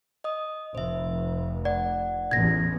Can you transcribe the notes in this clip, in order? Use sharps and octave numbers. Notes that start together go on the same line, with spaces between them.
D#5 D#6
F1 C5 E5
D5 F#5
A1 E2 G#6 A#6